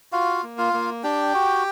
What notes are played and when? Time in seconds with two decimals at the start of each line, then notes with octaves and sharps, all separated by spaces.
0.12 F4 F#4 F5
0.43 A#3
0.58 F4 F5
0.73 A#3
1.04 D4 G4 G5
1.34 F#4